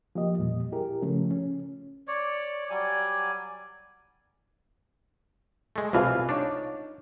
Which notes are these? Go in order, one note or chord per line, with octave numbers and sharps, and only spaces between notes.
F3 A#3 G4 D#5
E2 A#2 G3
E4 G4 G#4 A#4
C#3 F3 A3 C#4
C#4
C#5 D5
F#3 G3 D5 G#5
G#3 A3
C2 B2 E3 F4 G#4 F5
D4 D#4 C#5